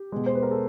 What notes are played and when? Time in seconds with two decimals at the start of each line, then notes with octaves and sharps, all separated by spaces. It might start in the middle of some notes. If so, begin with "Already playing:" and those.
Already playing: G4
0.12 B2 G#3
0.26 C5
0.35 B4
0.43 A#4
0.51 A4